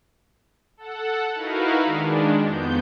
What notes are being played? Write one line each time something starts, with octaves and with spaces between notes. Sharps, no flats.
A4 F#5
D#4 E4 F#4 A#4 B4 F5
D#3 G#3 D4
F2 B3 G6